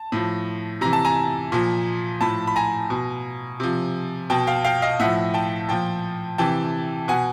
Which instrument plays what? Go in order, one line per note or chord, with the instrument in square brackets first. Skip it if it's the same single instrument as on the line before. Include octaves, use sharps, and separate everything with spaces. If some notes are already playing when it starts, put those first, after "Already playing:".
Already playing: [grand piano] A5
A2 F3
C3 E3 A#5
A5
G#5 A#5
A#2 F3
A2 F3 A5 B5
B5
G#5 A#5
B2
C3 F3
B2 G5 A5
F5 G5
F5 G5
D#5 F5
A2 F3 E5 F#5
G5 A5
A#2 F3 G5 A5
C3 E3 G5 A5
B2 F#5 G#5